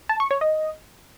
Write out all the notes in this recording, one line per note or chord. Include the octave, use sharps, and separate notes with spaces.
A5
C#6
C#5
D#5